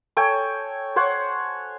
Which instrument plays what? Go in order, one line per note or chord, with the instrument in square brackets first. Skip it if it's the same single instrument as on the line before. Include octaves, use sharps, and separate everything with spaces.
[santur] A4 C#5 G5 G#5
C5 C#5 F#5